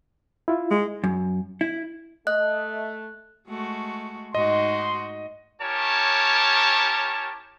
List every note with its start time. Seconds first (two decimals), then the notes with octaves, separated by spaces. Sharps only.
0.48 E4 F4
0.71 G#3
1.04 F#2
1.61 E4
2.27 A3 D#5 F#6
3.48 G#3 A3 F#4
4.35 G#2 D#4 F#4 D#5 C6
5.61 C#4 E4 G4 A#4 C#5 A5